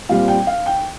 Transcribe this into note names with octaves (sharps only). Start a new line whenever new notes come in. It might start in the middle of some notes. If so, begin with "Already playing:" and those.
A#2 G3 C4 F5
G5
F5
G5